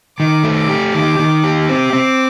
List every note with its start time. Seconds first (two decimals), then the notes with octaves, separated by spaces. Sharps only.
0.19 D#3 D6
0.44 A3
0.56 D6
0.69 G4
0.94 D#3 D6
1.19 D#3
1.44 G4
1.68 C4 D6
1.93 C4